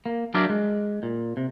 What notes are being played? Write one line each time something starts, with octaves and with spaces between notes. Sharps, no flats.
A#3
F#3 D4 A#4 D5 E5 F5
G#3
A#2
C3